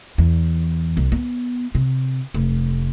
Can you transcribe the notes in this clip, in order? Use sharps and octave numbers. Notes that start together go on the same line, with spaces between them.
E2
C2
B3
C3
F1